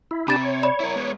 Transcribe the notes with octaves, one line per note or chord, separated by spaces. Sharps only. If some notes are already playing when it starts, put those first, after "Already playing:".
E4
C3 D4 G4 B5 A6 E7
C#5
D5 B5
E4 A#4
G#3 B3